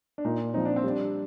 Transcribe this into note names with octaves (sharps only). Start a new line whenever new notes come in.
D4
A#2 D#4
F3 C4 D#4
D4
C4
G3 D4